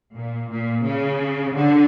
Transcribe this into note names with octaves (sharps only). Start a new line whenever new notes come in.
A#2
A#2
C#3
D3